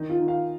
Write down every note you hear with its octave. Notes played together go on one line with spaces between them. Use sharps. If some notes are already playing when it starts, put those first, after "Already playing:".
Already playing: D#3 D#4
F4
D#3
F5